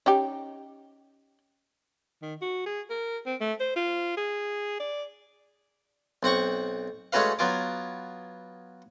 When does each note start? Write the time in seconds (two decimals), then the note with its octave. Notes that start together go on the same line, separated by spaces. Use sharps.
0.06 C#4 D#4 G4
2.22 D#3
2.41 F#4
2.66 G#4
2.90 A#4
3.26 C4
3.41 A3
3.60 C5
3.76 F4
4.17 G#4
4.80 D5
6.23 B1 C4 F#5 C#6
7.13 G#3 A3 C#4 F#4 B4 F5
7.39 F#3 B3 F4 G#5 D6